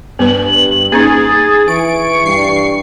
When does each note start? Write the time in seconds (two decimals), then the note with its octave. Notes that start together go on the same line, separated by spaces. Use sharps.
0.19 G2 B3 B4 F#7
0.92 A#3 C#4 D#4 G#4 A6
1.68 E3 C#6 D7
2.26 G2 C7